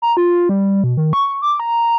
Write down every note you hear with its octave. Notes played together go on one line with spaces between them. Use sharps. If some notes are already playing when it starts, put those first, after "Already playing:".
A#5
F4
G3
B2
D#3
C#6
D6
A#5